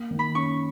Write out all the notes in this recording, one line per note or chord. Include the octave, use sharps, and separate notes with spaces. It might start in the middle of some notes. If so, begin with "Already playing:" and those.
Already playing: A#3
D#3
B5
C#4 C#6